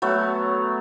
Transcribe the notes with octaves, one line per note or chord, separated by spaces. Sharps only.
F#3 A3 B3